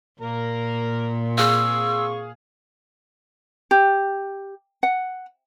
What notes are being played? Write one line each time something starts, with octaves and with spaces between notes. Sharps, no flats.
A#2 A#3 A#4 A#5
C4 G#4 F5 C#6 E6
G4
F#5